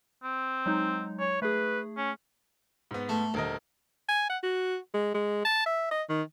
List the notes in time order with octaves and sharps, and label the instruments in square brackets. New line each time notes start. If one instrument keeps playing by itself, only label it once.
[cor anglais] C4
[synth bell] F#3 G#3 D#4
[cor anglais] C#5
[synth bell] A3 G#4 [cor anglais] B4
[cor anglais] C#4
[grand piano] G#2 B3
[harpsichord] A3
[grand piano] D#1 A#4 D#5 [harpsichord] D2
[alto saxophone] G#5
F#5
F#4
G#3
G#3
A5
E5
D#5
D#3